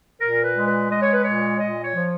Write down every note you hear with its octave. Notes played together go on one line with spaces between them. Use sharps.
A#2 A#4
B4
G#3
B4
G#3 D#5
C#5
B4
A#2 C#5
A#2 D#5
C#5
F3